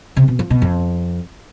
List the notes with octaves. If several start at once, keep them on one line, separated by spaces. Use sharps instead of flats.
C3
B2
F3
B2
F2